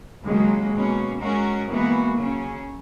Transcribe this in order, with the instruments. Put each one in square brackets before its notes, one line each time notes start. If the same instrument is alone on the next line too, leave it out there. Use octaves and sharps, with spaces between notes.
[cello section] D#2 C#3 F#3 A#3 [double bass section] G#3
[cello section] B2 A#3 C#4
G#3 C#4 F#4 A#4
[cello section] E3 G#3 B3 F#4 [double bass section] A#3
[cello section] C#3 F#3 C#4